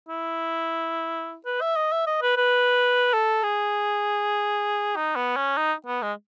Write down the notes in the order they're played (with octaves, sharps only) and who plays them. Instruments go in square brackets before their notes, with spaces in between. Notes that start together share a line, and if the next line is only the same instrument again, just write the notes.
[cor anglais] E4
B4
E5
D#5
E5
D#5
B4
B4
A4
G#4
D#4
B3
C#4
D#4
B3
G#3